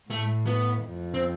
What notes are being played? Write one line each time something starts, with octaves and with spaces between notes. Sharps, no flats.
A2 A3
B3
F2
C4